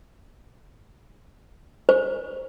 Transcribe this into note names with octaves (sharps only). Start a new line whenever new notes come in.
C5